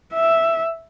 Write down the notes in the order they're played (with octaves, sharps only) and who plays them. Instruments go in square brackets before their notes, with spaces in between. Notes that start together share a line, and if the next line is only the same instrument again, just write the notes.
[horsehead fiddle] E5